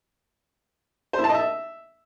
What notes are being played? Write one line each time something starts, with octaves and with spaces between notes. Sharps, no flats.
C5
E4
A5
D#5
E5